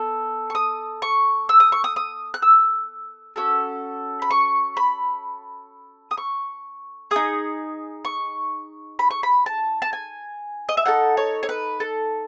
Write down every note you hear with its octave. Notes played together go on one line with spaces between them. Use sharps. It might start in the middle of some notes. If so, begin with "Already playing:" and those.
Already playing: B3 A4
C#6
D#6
C#6
E6
D#6
C#6
D#6
D#6
F#6
E6
C#4 F#4 A4 E6
B5
C#6
B5
D#6
C#6
D#4 G#4 D#6
C#6
B5
C#6
B5
A5
A5
G#5
D#5
E5
D#4 A4 F#5
C#5
C#5
B4
A4